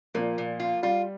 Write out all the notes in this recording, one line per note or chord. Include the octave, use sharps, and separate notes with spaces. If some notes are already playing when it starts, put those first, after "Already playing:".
A#2 F3 A#3
A#2
F4
G3 F4